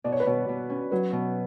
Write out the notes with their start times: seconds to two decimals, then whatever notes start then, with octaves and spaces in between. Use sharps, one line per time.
0.04 B2 D5
0.12 C#5
0.20 B4
0.26 B2 C#5
0.49 B2
0.70 C#4
0.91 F#3 B4
1.13 B2